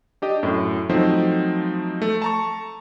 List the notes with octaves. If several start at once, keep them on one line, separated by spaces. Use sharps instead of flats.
D4 G4 D#5
F#2 A2
F3 F#3 A3 C4 D#4 C5
A3
A5 A#5 C#6